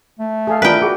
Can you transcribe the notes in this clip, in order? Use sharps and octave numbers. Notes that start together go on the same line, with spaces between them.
A3
G#4 A4 F5
D4 E4 F4 A#4 B4 G5 G#5
F#4 G#4